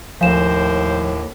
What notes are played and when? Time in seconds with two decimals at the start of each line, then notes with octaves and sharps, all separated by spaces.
0.21 D#2 A2 F3 A#4 C5 F5 G#5 E7